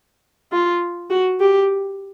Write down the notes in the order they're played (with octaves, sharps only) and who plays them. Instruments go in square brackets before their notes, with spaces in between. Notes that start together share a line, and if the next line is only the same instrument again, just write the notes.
[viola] F4
F#4
G4